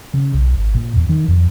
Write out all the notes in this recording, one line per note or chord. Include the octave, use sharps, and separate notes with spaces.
C#3
B1
G#1
A#2
E2
D#3
F2